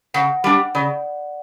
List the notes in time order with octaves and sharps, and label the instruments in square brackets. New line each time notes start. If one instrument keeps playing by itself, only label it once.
[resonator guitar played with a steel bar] C#3 [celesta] F#5
[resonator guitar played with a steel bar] G3 D4
[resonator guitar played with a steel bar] C#3 [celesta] D5